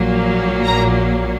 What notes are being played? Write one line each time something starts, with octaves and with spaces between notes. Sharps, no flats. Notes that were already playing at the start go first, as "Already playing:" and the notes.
Already playing: A#1 A#2 F#3 A#3
A#5